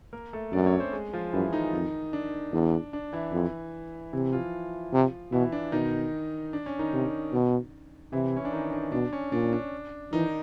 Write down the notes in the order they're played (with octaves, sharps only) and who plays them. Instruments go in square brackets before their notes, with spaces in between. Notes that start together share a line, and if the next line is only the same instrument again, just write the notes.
[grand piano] A#3 A#4
A3 A4
[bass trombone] F#2 [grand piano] D4 D5
[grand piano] C#4 C#5
C4 C5
G#3 G#4
F3 F4
[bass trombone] F#2 [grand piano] E3 E4
[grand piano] D#3 D#4
[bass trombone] F2
[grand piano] D4
[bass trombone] E2
[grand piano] D4
E3 E4
[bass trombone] F2
[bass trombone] C3 [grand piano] E3 E4
[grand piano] F3 F4
[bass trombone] C3
[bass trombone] B2 [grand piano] E3 E4
[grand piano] D4
[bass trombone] B2 [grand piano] D#3 D#4
[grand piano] D4
C#4
D#3 D#4
[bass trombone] C3
B2
[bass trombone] C3 [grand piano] E3 E4
[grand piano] C#4
D4
D#3 D#4
D4
[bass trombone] B2 [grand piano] D4
[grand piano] C#4
[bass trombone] A#2 [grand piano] D4
[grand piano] D4
[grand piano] D#3 D#4 [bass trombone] E3